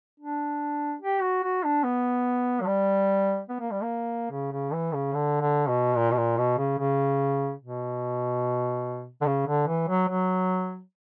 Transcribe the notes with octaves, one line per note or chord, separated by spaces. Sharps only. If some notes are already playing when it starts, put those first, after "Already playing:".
D4
G4
F#4
F#4
D4
B3
F#3
G3
B3
A#3
G3
A#3
C#3
C#3
E3
C#3
D3
D3
B2
A#2
B2
A#2
B2
C#3
C#3
B2
D3
C#3
D3
E3
F#3
F#3